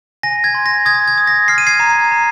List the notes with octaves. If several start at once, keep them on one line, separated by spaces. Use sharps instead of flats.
G#5 A#6
G#6
C6
A#6
D#6 G#6
G#6
D#6
A#6
F6 C7
D#7
G#6 C7
A#5
A#5